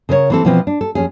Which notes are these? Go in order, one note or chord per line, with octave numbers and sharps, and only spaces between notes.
C#3 A#4 B4 C#5
E3 C4 A4
B2 E3 F3 C4 G#4 B4
D4
A4
F2 C#4 G#4